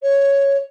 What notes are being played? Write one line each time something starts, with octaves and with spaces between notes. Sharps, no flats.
C#5